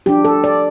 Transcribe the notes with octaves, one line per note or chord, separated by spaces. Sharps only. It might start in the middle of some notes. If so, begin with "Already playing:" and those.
F3 D4 G4
A4
D5